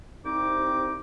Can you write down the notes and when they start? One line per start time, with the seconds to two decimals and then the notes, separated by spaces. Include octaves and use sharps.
0.25 C2 C3 C4 D#4 D6